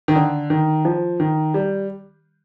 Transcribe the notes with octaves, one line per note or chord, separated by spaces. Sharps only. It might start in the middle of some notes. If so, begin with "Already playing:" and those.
D#3
D3
D#3
F3
D#3
G3